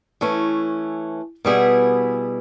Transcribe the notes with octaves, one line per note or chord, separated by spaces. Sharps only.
E3 A3 C#4
B2 G3 B3 E4 G#4